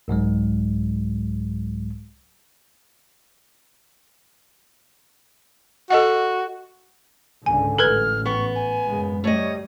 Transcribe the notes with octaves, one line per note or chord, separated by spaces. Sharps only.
C2 G#2 F#3 G#3
F#4 A4 D#5 F#5
C#2 G#2 D3 G#5
A1 A4 B4 F6 G#6
B3 C#6
G#5
F#2 C#3 G#3
G3 A3 C#5 D#5